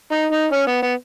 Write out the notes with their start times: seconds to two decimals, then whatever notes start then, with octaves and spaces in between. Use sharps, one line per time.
0.12 D#4
0.32 D#4
0.52 C#4
0.67 B3
0.82 B3